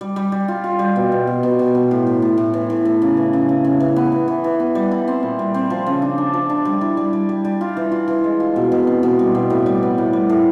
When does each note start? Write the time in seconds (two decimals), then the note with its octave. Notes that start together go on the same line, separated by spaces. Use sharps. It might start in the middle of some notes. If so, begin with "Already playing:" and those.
0.01 G3
0.16 G3
0.32 G3
0.48 F4
0.64 F4
0.79 G3
0.96 B2
1.12 B2
1.27 B2
1.43 B2
1.59 B2
1.75 B2
1.91 A2
2.07 A2
2.22 A2
2.38 A2
2.54 E3
2.70 A2
2.85 E3
3.02 C#3
3.17 E3
3.33 C#3
3.49 C#3
3.64 C#3
3.80 E3
3.96 B3
4.12 B3
4.28 E3
4.44 E3
4.60 B3
4.75 G3
4.91 E4
5.08 C4
5.23 A#2
5.39 G3
5.54 C4
5.70 F3
5.86 C#3
6.02 D4
6.18 D4
6.33 F3
6.49 D4
6.65 G3
6.81 E4
6.97 G3
7.13 G3
7.29 G3
7.45 G3
7.61 F4
7.77 E3
7.92 F4
8.08 E3
8.24 G#3
8.40 F4
8.56 B2
8.72 B2
8.87 C4
9.03 B2
9.19 G3
9.35 B2
9.50 A2
9.66 G3
9.83 B3
9.98 A2
10.13 G3
10.30 A2